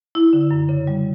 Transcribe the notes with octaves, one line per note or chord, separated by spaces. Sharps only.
E4
D3
F#2
C#3
G3